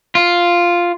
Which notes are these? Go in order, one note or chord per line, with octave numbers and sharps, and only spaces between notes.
F4